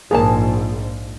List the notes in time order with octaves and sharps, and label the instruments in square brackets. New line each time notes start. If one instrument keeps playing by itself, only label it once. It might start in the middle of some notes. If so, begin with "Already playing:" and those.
[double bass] A#1 G#2 [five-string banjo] F3 A#3 A5 [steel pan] G#4